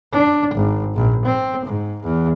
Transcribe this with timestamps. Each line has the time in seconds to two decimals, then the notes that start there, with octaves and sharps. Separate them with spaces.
0.13 D4
0.55 G#1
0.96 A#1
1.25 C4
1.65 G#2
2.03 E2